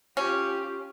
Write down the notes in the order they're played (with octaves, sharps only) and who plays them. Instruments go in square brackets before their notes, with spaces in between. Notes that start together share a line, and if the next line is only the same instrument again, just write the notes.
[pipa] C#4 [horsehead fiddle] F4 G4